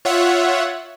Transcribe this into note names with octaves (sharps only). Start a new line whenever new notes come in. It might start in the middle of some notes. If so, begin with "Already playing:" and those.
F4 C#5 E5 F#5